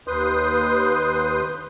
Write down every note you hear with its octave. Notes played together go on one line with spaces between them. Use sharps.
D#2 B4 C6 D#6 G6